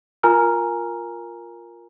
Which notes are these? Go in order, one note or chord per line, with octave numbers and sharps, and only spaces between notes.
F4 A#4 G#5 A#5 F6